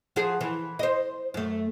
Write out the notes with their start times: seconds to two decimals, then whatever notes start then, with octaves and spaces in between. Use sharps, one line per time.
0.16 F3 F#4 G#4
0.41 E3
0.79 C5 D#5
1.34 F#2 A3